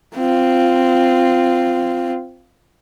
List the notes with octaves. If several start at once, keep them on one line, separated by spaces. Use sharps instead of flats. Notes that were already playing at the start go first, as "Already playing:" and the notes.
C4 F4